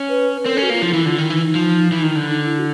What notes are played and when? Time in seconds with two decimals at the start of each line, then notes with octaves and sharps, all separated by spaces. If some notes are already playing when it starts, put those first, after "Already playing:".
Already playing: C#4
0.09 B4
0.45 C4 A#4
0.55 C#4 A4
0.63 F#4
0.70 A#3 F4
0.82 F3 E4
0.93 E3 E4
1.06 D3 F4
1.18 D#3 E4
1.30 E3 D#4
1.43 D#4
1.55 F3
1.92 E3
2.03 D#3
2.15 D3
2.28 D#4
2.45 E4
2.59 F#4